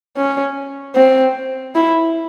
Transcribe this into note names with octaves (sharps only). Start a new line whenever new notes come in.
C#4
C4
E4